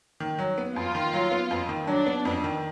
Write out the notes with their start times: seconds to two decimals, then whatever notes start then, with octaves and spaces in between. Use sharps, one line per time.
0.20 D#3
0.39 F#3
0.58 B3
0.76 F2 F4
0.95 D#3
1.13 F#3
1.32 B3
1.51 F2
1.69 D#3
1.87 F#3 D4
2.06 B3
2.25 F2
2.44 D#3